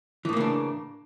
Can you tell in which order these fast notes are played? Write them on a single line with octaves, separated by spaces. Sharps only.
E3 A2 A#3 C#3 D4